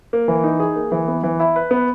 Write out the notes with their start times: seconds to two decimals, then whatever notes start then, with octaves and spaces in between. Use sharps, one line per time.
0.13 A#3
0.28 E3
0.44 D#4
0.60 G#4
0.76 A#3
0.92 E3
1.08 B3
1.23 E3
1.40 E4
1.56 B4
1.71 B3